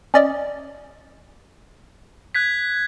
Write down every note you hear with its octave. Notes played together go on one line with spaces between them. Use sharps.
C#4 D5 D#5
F#6 G#6 B6